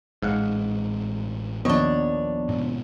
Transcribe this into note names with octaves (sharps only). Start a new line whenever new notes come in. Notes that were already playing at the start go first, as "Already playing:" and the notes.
A1 G#2 G#3 F5 F#5
A#1 D#2 B3 D4 C#5 D#5
G#2 B2